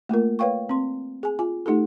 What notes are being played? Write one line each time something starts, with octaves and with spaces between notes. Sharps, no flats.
A3 A#3 F4 A#4
B4 C#5 F5 G5 C#6
C4 C6
G#4 G#5
F4 G#5
A3 D#4 G4 A4